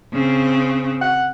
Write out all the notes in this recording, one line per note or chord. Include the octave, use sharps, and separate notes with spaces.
C#3 C4
F#5